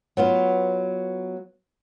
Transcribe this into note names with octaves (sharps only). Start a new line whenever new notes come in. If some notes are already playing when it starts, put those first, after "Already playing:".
F#3 B3 F4